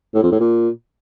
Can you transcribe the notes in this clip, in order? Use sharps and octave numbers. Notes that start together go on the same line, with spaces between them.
A2
F2
A2
A#2